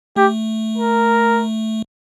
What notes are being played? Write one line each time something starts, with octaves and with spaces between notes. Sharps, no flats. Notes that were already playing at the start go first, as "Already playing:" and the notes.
A3 G4
A#4